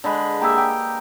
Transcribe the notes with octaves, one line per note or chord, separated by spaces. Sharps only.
D3 G#3 B4
A#3 G4 G#4 E5
D#5 G5